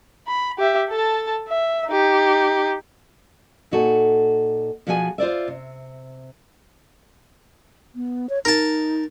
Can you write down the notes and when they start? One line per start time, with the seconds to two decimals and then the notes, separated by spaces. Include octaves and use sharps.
0.28 B5
0.58 G4 E5
0.89 A4 A5
1.48 E5
1.88 D#4 G4
3.71 A#2 D#4 F#4 A4 G#5
4.87 B2 F3 F#4 G#4 D#5 G#5
5.18 F4 C5 D5 E5
5.48 C3
7.95 B3
8.29 C#5
8.45 D#4 A#4 A5